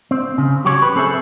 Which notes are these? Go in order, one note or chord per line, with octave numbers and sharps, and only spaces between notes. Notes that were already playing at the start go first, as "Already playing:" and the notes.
C4
C#3
F#3 G4 C#5
B4
C4 G#4 A4 D#5 E5